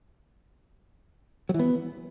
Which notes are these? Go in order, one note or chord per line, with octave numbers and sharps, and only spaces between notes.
F#3
E3
B3